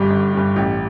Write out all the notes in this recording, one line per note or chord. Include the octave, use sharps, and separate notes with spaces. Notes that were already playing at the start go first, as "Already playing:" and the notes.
Already playing: G1 G2 G3 G4
G1
G2 G3
A1 G4